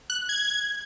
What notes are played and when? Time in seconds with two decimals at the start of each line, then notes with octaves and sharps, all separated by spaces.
0.10 F#6
0.29 G#6